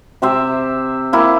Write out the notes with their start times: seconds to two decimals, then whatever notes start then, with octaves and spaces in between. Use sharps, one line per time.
0.22 C3 G4 C5 E5
1.13 A#3 E4 G4 D6